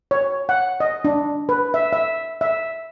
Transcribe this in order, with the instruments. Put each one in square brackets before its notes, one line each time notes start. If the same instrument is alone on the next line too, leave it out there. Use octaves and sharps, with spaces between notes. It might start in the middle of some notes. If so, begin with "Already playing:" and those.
[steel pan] C#5
F#5
D#5
D4
B4
E5
E5
E5